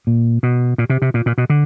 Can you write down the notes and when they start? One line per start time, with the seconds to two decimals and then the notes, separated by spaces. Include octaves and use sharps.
0.07 A#2
0.43 B2
0.78 A#2
0.90 C3
1.02 C3
1.14 A#2
1.26 A#2
1.38 B2
1.50 D3